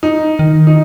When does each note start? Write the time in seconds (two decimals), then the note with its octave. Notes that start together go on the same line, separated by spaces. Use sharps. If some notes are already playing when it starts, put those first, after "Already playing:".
0.03 D#4
0.39 D#3
0.67 D#4